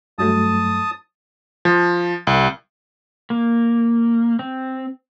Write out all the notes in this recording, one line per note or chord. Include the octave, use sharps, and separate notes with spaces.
G2 F#3 A3 A5 D#6
F3
C2
A#3
C4